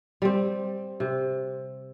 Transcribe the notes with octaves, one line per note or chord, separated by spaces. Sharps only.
G3 C4
C3